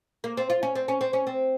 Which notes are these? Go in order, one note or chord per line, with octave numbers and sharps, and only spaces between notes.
A#3
C4
F4
C#4
C4
C#4
C4
C#4
C4